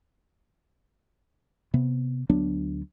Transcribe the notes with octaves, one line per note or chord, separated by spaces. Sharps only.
C3 B3
D2 F#3 B3 D4